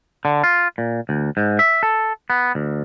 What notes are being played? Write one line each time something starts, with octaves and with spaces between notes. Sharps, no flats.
D3
F4
A#2
D2
G#2
E5
A4
B3
D2